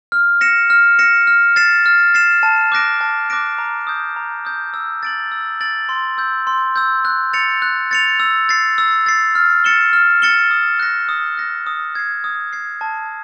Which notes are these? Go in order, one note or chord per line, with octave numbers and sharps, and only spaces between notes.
F6
A#6 C#7 E7
F6
A#6 C#7 E7
F6
A6 C7 E7
F6
A6 C7 E7
A5
D6 F#6 A#6 D7
A5
D6 F#6 A#6 D7
A#5
D#6 G6
A#5
D#6 G6
E6
A6 D7 F#7
E6
A6 D7 F#7
C6
E6 G6
C6
E6 G6
F#6
A6 C#7 F7
F#6
A6 C#7 F7
E6
A6 C7
E6
A6 C7
F6
A6 C#7 E7 G7
F6
A6 C#7 E7 G7
D#6
F#6 A#6
D#6
F#6 A#6
D#6
G#6 C7
D#6
G#6 C7
A5